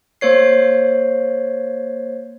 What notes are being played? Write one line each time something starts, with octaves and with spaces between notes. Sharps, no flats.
A#3 C5 C#5 C7